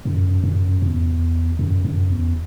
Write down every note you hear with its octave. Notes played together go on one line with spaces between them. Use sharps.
F#2
F#2
E2
F#2
F#2
E2